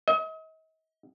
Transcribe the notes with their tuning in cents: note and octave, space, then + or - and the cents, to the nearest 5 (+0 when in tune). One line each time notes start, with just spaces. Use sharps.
D#5 +40